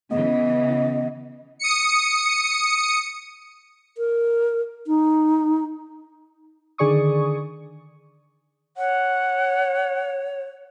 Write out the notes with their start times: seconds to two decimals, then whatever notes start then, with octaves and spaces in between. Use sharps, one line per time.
0.11 C#3 E3 B3 D#5
1.59 D#6 C#7
3.98 A#4
4.87 D#4
6.78 D3 D#3 G#4 D5 C#6 D#6
8.76 C#5 F#5